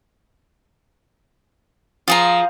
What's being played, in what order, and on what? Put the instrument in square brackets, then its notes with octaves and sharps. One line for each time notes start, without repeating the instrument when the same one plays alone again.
[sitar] F3 [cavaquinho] F4 G#4 A#5